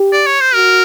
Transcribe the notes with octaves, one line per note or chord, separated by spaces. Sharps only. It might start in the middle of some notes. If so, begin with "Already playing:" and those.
Already playing: G4
D5
C#5
C5
F#4 A#4